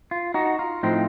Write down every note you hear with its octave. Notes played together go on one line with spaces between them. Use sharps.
F4
D#4 F#4
F4
A2 F3 C4 D#4